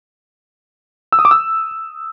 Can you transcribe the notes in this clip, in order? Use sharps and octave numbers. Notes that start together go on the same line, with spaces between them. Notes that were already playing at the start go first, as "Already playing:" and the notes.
E6
D#6
D6
E6